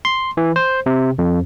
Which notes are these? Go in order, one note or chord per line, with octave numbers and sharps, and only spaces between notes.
C6
E3
C5
C3
F2